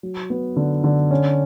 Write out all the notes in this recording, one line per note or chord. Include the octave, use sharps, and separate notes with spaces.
F#3
B3
D3
D3
C#4